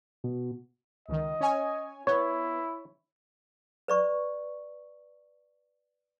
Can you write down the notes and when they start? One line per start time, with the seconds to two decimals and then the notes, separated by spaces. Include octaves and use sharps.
0.24 B2
1.09 C#2 D#3 D#5
1.41 C#4 C#5 G#5
2.07 B3 E4 C#5
3.88 B4 D5 C#6